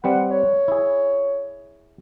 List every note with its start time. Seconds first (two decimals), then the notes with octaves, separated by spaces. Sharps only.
0.04 G3 C4 B4 F#5
0.30 C#5
0.68 E4 G#4